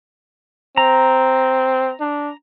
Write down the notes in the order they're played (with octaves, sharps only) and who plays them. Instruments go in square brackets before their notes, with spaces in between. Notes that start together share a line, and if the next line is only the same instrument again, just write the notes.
[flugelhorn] C4 [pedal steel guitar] A#5
[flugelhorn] D4